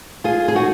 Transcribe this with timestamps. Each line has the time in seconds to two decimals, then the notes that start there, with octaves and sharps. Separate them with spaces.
0.24 F4 G#4
0.48 G#4
0.55 D#4 F#4